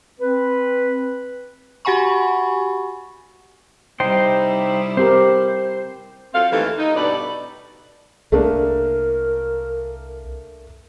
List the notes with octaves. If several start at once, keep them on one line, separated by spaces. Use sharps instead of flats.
C4 B4
F#4 G4 F#5 G#5 B5 C#6
C3 G3 D#4 E4 C5 G5
C4 G4 A#4 C5
F#3 C4 F4 A4 F5
D#2 E3 A3 D#4 G4 A4
D#4
G2 B2 A4 B4 D5
C2 A3 A#3 D4 A#4